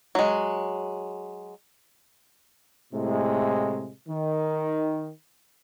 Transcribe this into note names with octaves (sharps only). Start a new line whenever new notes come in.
F#3 G#3
A2 C3 G#3
D#3